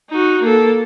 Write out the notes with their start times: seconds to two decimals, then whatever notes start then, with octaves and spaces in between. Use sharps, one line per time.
0.10 D#4 F#4
0.42 A#3 A4